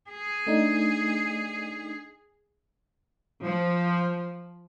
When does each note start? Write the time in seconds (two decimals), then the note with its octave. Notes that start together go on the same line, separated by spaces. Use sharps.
0.10 G#4
0.47 A3 D4 D#4
3.44 F3